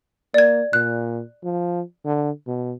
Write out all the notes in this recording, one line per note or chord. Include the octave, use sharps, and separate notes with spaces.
A#3 D5 G#6
A#2 F#6
F3
D3
B2